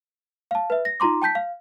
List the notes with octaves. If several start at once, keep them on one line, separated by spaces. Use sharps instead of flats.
F5 A5
B4 E5
A#6
D#4 F4 A#5 C6 D6
G5 A5 G6 B6
F5